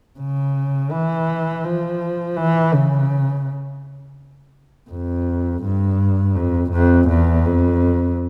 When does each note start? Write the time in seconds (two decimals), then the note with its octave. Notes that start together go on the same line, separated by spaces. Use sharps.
0.20 C#3
0.91 E3
1.64 F3
2.36 E3
2.74 C#3
4.90 F2
5.63 G2
6.36 F2
6.72 F2
7.09 E2
7.46 F2